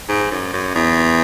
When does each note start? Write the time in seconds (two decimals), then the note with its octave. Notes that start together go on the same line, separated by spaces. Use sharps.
0.09 G#2
0.31 F#2
0.53 F#2
0.75 E2